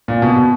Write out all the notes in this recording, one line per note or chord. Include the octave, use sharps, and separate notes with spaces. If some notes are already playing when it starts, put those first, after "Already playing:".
A#2
B2
B2